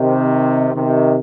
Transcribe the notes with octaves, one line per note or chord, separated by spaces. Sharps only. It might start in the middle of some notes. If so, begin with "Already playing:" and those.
Already playing: C3 D#3
C3 D#3